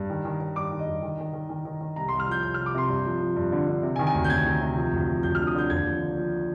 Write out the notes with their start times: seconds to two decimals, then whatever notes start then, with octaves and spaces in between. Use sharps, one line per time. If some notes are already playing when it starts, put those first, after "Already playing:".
Already playing: G2
0.10 D#3
0.25 D#3
0.41 D#3
0.56 G2 D6
0.72 D#3
0.79 D#5
0.87 G2
1.03 D#3
1.19 D#3
1.33 D#3
1.49 D#3
1.65 D#3
1.81 D#3
1.96 C2 A#5
2.08 C6
2.12 C2
2.20 F6
2.28 F3 G6
2.43 C2 G6
2.54 F6
2.59 C2
2.66 D6
2.74 C3 C6
2.89 G2
3.05 F3
3.21 F3
3.36 G2
3.52 D3
3.68 D3
3.83 C3
3.96 G#5
3.99 D#3
4.07 G#5
4.14 D2
4.24 G6
4.30 D2 G#6
4.46 D#3
4.61 C3
4.77 F3
4.93 D2
5.08 F3
5.23 D2 G6
5.35 F6
5.39 D3
5.47 D#6
5.55 D3 G6
5.70 D#2 G#6
5.86 F3
6.02 D3
6.17 F3